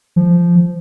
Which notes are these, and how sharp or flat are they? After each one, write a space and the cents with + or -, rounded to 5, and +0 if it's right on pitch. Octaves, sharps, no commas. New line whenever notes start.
F3 -10